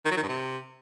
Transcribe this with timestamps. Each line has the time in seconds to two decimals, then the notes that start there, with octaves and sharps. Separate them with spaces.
0.05 D#3
0.11 F#3
0.17 D#3
0.22 G2
0.28 C3